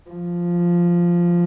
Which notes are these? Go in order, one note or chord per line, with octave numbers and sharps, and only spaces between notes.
F3